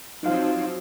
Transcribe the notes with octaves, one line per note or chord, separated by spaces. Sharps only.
F3 F#3 C4 D#4 F5